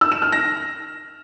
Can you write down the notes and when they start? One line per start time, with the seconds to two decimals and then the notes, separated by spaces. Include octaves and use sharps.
0.01 E6
0.12 E7
0.22 F6
0.32 A#6